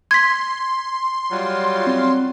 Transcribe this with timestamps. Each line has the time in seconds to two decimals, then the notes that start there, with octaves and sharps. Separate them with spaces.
0.11 C6 G#6 B6
1.31 F#3 G3 F4
1.87 C4